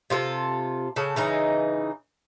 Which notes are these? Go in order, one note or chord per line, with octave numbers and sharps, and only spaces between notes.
C3 F4 G#4 A4
C#3 A4
C#3 E3 D#4